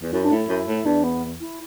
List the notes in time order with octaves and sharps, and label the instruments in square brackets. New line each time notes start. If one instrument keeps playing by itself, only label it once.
[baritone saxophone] E2
[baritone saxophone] F#2 [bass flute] E4
[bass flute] D4
[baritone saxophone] A2 [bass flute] E4
[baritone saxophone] F#2
A2
[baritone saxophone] E2 [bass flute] D4
[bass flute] B3
E4